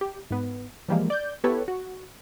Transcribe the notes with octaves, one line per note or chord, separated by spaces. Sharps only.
G4
G#2 B3
E3 F3 G3 G#3 A#3
D5 G6
B3 E4 G4 A4 B4 C#5
F#4